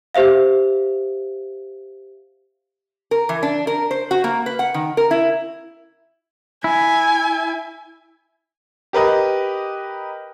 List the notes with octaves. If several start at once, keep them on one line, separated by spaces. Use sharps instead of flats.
G4 C5 E5 F5
A#4
E3
D4
A#4
C5
F#4
A#3
B4
F#5
D#3
A#4
E4
E4 G#5
G4 A#4 B4 D#5